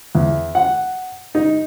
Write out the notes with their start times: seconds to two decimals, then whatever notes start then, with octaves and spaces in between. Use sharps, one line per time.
0.15 E2
0.55 F#5
1.35 D#4